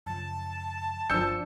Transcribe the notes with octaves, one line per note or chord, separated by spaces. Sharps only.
F#2 C#3 F3 A5
G1 F3 F#3 D4 D5 E6 G6 C#7